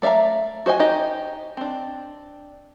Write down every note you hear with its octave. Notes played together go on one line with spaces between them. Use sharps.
A3 D5 E5 F5 A#5
F#4 C5 D#5 G#5
D#4 G4 D#5
C4 D4